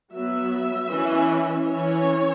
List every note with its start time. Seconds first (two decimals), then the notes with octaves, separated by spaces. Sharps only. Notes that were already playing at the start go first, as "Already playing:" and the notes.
0.13 F#3 B3 E5
0.90 E3 C#4
1.68 E3 C#4 C#5